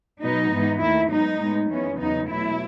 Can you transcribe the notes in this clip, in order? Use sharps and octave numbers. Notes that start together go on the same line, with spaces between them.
B2 F#3 B3 D#4
G#2 E3 B3
D#2 D#3 A3 E4
G#2 F#3 B3 D#4
A2 G#3 B3
F#2 E3 G#3 B3 C#4
E2 C#3 F#3 B3 D#4
B2 F#3 A3 E4